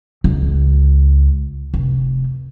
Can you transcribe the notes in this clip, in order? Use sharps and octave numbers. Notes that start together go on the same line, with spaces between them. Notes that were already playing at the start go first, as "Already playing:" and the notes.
C#2
F1